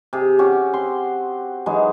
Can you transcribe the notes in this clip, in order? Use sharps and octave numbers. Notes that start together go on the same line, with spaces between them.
C3 G#4
C#4 F#4 G4
C4 C6
E3 F#3 G#3 D#4